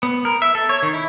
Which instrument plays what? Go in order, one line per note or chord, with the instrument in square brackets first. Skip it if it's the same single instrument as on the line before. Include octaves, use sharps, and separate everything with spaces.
[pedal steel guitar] B3
A#4
E5
A4
C#5
D#3
E4